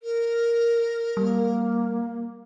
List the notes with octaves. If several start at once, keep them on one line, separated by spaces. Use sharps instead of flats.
A#4
G3 A#3